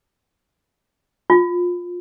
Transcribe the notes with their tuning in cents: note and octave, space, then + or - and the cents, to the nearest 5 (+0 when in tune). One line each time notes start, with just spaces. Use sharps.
F4 +15